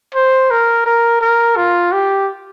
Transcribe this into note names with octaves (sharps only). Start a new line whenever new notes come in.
C5
A#4
A#4
A#4
F4
G4